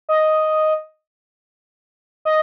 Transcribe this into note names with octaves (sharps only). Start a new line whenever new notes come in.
D#5
D#5